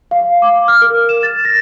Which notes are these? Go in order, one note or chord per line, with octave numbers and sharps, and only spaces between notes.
F5
D6
F6
A#4
E7
A6
A#6